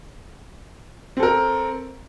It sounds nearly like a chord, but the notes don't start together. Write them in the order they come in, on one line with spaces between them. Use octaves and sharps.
C4 A4 A#4